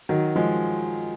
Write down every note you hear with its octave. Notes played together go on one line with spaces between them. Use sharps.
D#3 F#3
F3 G#3